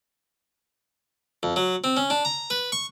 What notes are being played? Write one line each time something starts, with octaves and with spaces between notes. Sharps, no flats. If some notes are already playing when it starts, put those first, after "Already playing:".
F2
F#3
C4
C#4
D4
A#5
B4
C#6